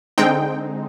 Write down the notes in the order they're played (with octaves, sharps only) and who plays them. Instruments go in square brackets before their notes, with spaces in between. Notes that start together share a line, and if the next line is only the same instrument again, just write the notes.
[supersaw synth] D3 G#3 C4 D#4 G5